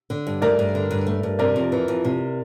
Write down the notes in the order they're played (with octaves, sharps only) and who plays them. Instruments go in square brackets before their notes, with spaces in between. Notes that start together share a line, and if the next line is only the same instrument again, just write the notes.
[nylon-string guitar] D3
G2
[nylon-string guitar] A3 [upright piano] A#4 D5
[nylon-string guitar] G2
D3
G2
A3
G2
[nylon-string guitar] C3 [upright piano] A#4 D5
[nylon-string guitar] F2
E3
F2
C3